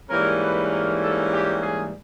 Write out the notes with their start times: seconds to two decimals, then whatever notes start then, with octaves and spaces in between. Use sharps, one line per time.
0.10 G#2 E3 G3 A#3 C#4 A#4
0.41 B4
0.71 A#4
1.02 A4
1.33 G4
1.62 G#4